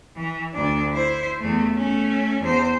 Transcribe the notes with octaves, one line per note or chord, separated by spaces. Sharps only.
E3
D2 D4
E4 C5
E2 A3
A3 C#4
E2 C5